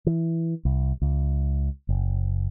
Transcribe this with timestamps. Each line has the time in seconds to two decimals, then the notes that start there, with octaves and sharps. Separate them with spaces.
0.07 E3
0.65 C2
1.02 C#2
1.89 F#1